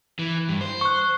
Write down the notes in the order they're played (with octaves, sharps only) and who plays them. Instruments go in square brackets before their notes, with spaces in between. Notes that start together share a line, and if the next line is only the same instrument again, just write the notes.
[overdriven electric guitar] E3
G2
C5
[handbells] C#6 F#6